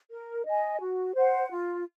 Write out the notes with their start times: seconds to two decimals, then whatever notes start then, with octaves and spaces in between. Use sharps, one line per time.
0.10 A#4
0.46 D#5 G#5
0.80 F#4
1.15 C5 F#5
1.50 F4